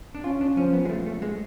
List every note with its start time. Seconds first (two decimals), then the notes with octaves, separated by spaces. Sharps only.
0.15 D4
0.24 C#4 F4
0.41 D4
0.57 F3 C#4
0.73 B3
0.85 G#3
0.90 A3
1.06 A3
1.22 G#3